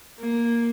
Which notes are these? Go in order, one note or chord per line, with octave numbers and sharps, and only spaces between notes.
A#3